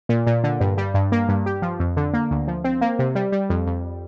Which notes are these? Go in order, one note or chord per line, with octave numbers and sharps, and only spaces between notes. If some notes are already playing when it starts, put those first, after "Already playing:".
A#2
A#2
D3
G2
G3
G2
A#3
G2
G4
F3
F2
D3
A#3
D2
F3
C4
A#3
C3
G3
G3
F2
F2